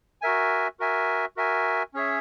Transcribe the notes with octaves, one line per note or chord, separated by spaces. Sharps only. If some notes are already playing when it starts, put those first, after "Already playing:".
F#4 A#4 E5 G#5
F#4 A#4 E5 G#5
F#4 A#4 E5 G#5
C#4 G#4 C#5 E5